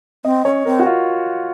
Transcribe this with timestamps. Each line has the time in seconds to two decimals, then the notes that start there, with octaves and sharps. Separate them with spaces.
0.24 C4 D#5
0.45 C#4 C#5
0.65 C4 A#4
0.79 F#4
0.86 F4